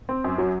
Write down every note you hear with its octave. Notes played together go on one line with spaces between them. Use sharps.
C4
F#2
F#3